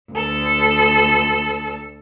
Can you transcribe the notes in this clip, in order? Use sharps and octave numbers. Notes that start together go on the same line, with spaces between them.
D2 A4